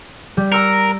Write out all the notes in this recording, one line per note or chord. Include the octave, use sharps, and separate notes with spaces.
G3
A#4 A#5 E6 C#7